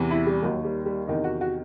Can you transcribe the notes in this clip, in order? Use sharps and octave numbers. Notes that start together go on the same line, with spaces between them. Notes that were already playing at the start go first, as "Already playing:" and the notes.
Already playing: E2 C3 E3
E4
G3
D#2 D#3 F#3
G3
G3
E2 C3 D#3 D#4
F#4
F#4